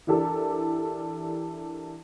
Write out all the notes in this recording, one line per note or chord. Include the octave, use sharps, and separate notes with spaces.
E3 D4 G4 A4 A#4